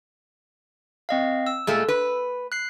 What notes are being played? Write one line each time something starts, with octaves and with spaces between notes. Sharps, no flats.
C4 D#5 F5
E6
A#2 G#3 A3
B4
F#6 C7